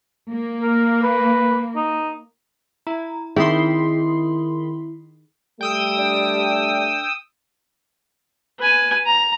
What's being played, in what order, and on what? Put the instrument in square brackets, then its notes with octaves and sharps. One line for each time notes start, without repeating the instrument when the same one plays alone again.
[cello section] A#3
[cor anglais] A#4
B4
D#4
[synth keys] E4 [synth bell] A#5
[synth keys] D#3 B5 C6 [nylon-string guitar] C4 E4 [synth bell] G#4 D#6
[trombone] G3 [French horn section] A3 [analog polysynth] G5 D#6 E6
[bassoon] D4
[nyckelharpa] B4 G#5
A#5